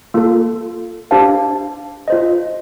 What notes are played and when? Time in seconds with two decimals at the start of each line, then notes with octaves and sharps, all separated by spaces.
0.14 A#3 F4 A4
1.11 D4 G4 C5 F5 A5
2.08 F4 C5 D#5